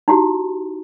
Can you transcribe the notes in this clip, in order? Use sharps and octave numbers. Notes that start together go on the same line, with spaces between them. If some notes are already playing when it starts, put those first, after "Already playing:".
D#4 E4 F#4 G4